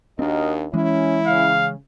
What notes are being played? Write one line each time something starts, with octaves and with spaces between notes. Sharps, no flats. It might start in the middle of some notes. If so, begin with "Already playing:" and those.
D#2 C4 D4 F#4 A#4 D#5
E3 G#3 C#4 E4
C#3 F5